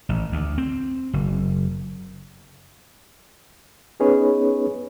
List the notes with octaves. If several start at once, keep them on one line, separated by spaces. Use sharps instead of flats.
A1
D2
C4
F#1
B3 C#4 D#4 G#4 B4 C#5